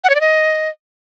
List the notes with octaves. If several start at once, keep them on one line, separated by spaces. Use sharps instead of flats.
F#5
C#5
D5
D#5